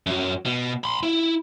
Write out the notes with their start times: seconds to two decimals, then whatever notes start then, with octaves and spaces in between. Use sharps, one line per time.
0.07 F#2 F#3
0.46 B2
0.84 B5 C6
1.03 E4